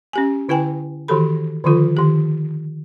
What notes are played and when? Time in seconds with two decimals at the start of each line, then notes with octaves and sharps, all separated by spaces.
0.13 C#4 G4 G#5
0.49 D3 E4 B4 G5 G#5
1.08 D#3 E3 F#4 G4 A4 B5
1.64 D3 D#3 F3 F4 A4
1.97 D#3 G4